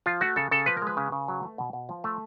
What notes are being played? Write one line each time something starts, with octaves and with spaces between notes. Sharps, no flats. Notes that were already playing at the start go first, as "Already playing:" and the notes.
F3 F4
A3 F#4
C#3 A4
C#3 A4
F3 B4
A#4
G#3 B4
C#3
C#3
F#3
A3
B2
B2
F3
A3